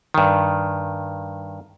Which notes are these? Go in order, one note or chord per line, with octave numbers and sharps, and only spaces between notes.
G2 D#3